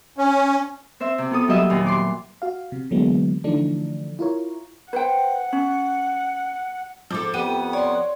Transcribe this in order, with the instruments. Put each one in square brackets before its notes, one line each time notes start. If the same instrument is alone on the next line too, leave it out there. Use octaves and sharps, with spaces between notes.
[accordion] C#4
[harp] C4 C5 E5
C3
B3 F4 A4 D#6
F#3 G3 A#3 D#5 E5
D#2 A#2
C6 D6
[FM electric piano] F#4 F5
C3
D3 E3 F#3 G#3 A#3 B3
D3 E3 F3 A3 D4 D#4
E4 F4 A#4 C#5
[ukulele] B4 C5 G5 [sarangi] F#5
[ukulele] C#4
[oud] G#2 A4 [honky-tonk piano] F3 D6
[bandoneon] F2 B3 F#5 [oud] G4 [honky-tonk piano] D#7
[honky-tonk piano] C#5 C6 [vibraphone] D5